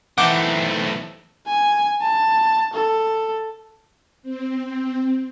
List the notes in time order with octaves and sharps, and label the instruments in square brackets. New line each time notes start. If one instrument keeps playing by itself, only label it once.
[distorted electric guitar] B1 A3 [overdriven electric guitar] D#3 C4 [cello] E3 [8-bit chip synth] F#5 D6 G6
[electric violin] G#5
A5
A4
[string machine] C4